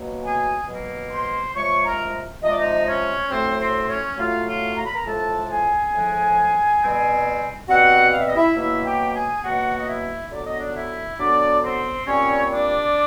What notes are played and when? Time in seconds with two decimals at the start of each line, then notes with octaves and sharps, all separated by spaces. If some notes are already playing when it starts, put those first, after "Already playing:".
Already playing: B2 F#3 A#3
0.24 G#4 G#5
0.68 B2 F#3 A#3
1.11 C5 C6
1.55 C3 F3 G#3 C#5 C#6
1.84 A#4 A#5
2.43 C3 F3 G#3 D#5
2.51 D5
2.58 D#4 D#5
2.87 C#4 C#5
3.30 A2 F#3 A3 C4 C5
3.59 C4 C5
3.89 C#4 C#5
4.18 A2 F#3 A3 F4 F5
4.47 F4 F5
4.76 A#5
4.85 B5
4.94 A#4 A#5
5.06 A2 F3 G#3 A4 A5
5.49 G#4 G#5
5.93 A2 F3 G#3
6.81 B2 G3 C4
7.68 B2 G3 C4 F#4 F#5
8.12 F5
8.20 E5
8.28 D#5
8.35 E4 E5
8.56 B2 F#3 A#3 E4 E5
8.85 G4 G5
9.14 G#4 G#5
9.43 B2 F#3 A#3 F#4 F#5
9.78 D#5
9.87 E4 E5
10.31 D3 F#3 B3 D5
10.45 D#5
10.58 D4 D5
10.75 E4 E5
11.19 D3 F#3 B3 D4 D5
11.63 C4 C5
12.06 A#2 G3 C4 C#4 C#5
12.50 D4 D5